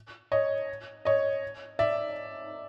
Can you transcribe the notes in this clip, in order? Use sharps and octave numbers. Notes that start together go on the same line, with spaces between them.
C#5 D#5
C#5 D#5
D5 E5